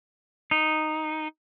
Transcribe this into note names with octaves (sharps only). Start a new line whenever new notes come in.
D#4